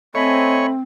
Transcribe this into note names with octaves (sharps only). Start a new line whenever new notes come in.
A3 C4 C#5 D#5 G#5 B5